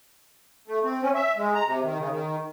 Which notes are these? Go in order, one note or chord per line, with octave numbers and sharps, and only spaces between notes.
A3
C4
C#4
E5
G#3
A#5
C3
D#3
C#3
D#3